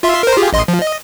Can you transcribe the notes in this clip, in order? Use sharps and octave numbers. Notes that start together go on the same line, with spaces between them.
F4 E5 C6
A#4 C5
F4 G4 G#4
A1 D#5 C6
F3
D#5